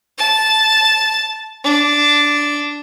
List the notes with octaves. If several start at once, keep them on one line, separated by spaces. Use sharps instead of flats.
A5
D4